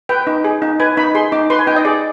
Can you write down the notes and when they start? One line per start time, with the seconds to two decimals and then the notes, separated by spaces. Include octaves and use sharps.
0.09 B4 G5
0.27 D#4
0.44 G#4
0.62 D#4
0.80 B4 G#5
0.97 D#4 B5
1.15 G#4 C6
1.32 D#4 D6
1.50 B4 C6
1.59 G#5
1.67 D#4 G5
1.76 D#5
1.85 G#4 D5